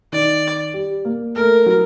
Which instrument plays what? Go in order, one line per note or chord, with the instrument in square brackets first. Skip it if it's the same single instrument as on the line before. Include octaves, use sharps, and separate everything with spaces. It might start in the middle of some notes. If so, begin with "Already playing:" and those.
[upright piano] D#3 [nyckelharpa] D5
[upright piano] G3
A#3
[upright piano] A3 [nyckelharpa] A#4
[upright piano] F#3